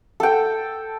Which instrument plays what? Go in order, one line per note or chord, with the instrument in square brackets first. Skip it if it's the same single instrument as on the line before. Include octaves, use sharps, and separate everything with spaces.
[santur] A4 G5